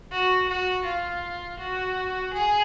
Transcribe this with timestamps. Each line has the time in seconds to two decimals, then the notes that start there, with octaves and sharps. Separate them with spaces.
0.12 F#4
0.48 F#4
0.85 F4
1.59 F#4
2.33 G#4